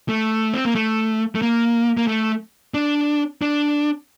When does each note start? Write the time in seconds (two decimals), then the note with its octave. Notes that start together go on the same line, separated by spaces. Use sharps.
0.09 A3
0.54 C4
0.65 A#3
0.75 A3
1.35 A3
1.42 A#3
1.97 A#3
2.07 A3
2.74 D4
3.42 D4